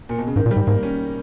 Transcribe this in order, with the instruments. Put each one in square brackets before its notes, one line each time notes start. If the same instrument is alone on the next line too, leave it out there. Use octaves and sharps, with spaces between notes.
[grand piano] A#2
B2
C#3
[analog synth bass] G#2 [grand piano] D#3
[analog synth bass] A#2
[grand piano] G3
[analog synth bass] G#2
[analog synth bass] G#2 [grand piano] A#3
[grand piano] C#4